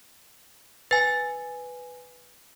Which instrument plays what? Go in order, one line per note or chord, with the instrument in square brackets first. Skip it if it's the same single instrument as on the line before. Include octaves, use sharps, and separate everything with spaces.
[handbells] B4 G#5 [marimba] A6